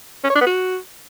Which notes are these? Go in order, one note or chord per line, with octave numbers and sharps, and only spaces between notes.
C#4
C#5
D4
B3
F#4